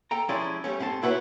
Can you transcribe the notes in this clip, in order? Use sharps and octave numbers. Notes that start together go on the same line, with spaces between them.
A4 G5 A#5
F3 G#3 C#4 E4 G4 D5
G3 A3 C#4
G#2 A3 C4 A#4 A5
D4 E4 F#4 A4 B4 C#5